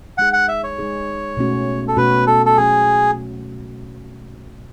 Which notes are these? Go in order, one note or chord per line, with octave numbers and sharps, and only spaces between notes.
G#3 D#4 G#4 F#5
F#5
E5
C#5
G#3 D#4 G#4
B2 A3 C#4 F#4
A4
B2 A3 C#4 F#4 B4
A4
A4
B2 F#3 A3 C#4 G#4